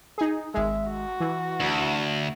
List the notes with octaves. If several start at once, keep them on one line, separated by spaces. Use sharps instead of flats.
D#4 G#4
G#1 G#3 E5
F#4
E3
D2